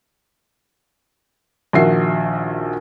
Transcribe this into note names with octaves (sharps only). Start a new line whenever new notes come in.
A#1 D#3 F#4 A#4 E5 C7